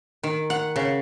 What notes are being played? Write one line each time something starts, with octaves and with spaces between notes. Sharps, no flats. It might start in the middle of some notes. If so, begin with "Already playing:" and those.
D#3
F#5
C#3